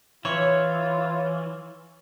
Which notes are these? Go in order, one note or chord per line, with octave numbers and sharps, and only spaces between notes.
E3 F4 C#5